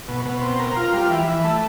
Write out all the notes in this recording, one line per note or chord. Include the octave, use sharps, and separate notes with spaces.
B2
B2
C4
A#4
F4
G3
E3
E3
A3